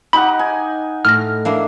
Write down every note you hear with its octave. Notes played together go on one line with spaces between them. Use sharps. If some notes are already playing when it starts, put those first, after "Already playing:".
D#4 G4 F#5 B5
G#5
A2 F6 A#6
A#3 D4 E4